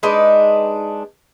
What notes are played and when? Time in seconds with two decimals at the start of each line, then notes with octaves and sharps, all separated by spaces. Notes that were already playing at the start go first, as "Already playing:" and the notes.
0.03 G#3 D4 D#4 B4